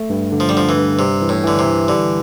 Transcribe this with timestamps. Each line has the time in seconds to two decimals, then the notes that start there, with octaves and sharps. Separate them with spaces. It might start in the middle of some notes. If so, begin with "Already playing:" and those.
Already playing: A3
0.10 G2
0.32 D3
0.40 F3
0.49 G3
0.55 D3 F3
0.69 E3
0.77 G2
0.99 C3 G3
1.22 E3
1.29 A2
1.44 D3 E3
1.59 C3
1.66 E3
1.88 D3 G3